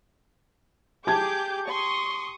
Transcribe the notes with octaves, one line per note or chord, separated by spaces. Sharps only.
G4 G#4 A5 D6 G6 G#6
C6 C#6 D#6